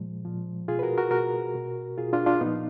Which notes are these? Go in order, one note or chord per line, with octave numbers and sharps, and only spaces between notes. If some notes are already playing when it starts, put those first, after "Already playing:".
Already playing: A#2 F3 G#3
A#2 F3
B2 F4 G#4
B4
F#4 A#4
F#4 A#4
B2 F#4 A#4
B2
B2 F4 G#4
D4 F4
D4 F4
A#2 F3 B3 D#4